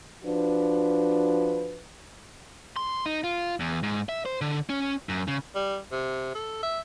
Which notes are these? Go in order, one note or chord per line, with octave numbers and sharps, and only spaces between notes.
F3 D4 F#4 B4
C6
D#4
F4
E2
G#2
E5
C5
D3
C#4
F#2
C#3
G3
C3
A4
E5